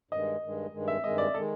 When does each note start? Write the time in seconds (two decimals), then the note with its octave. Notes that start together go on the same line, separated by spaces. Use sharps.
0.11 G2 D#3 G#3 D#5
0.42 G2 D#3 G#3
0.73 G2 D#3 G#3
0.88 E5
1.03 G2 D#3 G#3 D#5
1.18 D5
1.34 D#3 G#3 A4